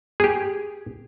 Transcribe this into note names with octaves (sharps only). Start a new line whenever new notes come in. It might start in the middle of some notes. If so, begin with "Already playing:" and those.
G4 G#4